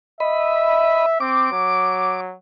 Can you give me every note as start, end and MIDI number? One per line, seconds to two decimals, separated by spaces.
0.20 1.06 75
0.20 1.19 76
0.20 1.06 83
1.20 1.49 60
1.20 2.20 86
1.52 2.34 54